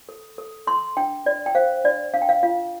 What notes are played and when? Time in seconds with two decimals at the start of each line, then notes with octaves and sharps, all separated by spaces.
0.09 A4
0.38 A4
0.67 A4 C6
0.97 D4 G5
1.25 D4 D5
1.46 G5
1.55 C5 F5
1.84 D4 D5
2.13 D4 F5
2.22 G5
2.29 F5
2.43 F4 F5